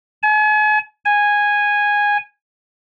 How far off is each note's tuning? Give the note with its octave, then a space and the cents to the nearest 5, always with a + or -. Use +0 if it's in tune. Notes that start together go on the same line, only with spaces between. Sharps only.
G#5 +40
G#5 -10